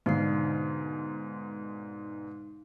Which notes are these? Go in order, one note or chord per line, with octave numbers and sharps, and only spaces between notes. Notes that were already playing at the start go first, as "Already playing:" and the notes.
G#2 B2 D3 D#4 F5 C7